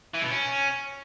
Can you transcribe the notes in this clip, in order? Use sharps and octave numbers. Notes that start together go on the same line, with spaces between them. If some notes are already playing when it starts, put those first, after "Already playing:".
E3
B2
C#4